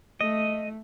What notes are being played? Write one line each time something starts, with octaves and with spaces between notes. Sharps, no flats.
A3 D#5